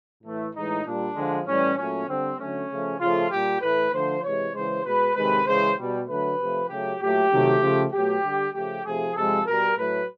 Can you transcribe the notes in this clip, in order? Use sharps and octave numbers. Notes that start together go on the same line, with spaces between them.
A2 E3 A3
A2 E3 G#3 D#4
A#2 G3 D4
D3 F3 G#3
A2 E3 G3 C#4
A#2 F#3 A3 C#4
D3 G3 C4
D3 F#3 A3 C#4
C#3 F3 A3
C#3 F3 A3 F4
A#2 G3 G4
A2 E3 A3 B4
D3 F3 A3 C5
C3 E3 G#3 C#5
C#3 E3 G#3 C5
B2 G#3 B4
C3 D#3 G#3 B4
C#3 E3 G#3 C5
B2 G3
D3 F#3 A3 B4
C3 F3 A3
C#3 F#3 A3 G4
A#2 F#3 A3 G4
C3 D#3 F#3 A3
C#3 F3 A3
B2 F#3 A3 G4
D3 G3
C#3 F3 A3 G4
C3 F3 A3 G#4
C3 F3 G#3 A4
B2 G3 A#4
A2 F#3 A3 B4